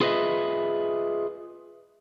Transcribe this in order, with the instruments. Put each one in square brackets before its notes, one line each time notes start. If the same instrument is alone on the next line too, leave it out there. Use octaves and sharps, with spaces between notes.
[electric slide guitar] F4 G#4 B4 C5 D#5 E5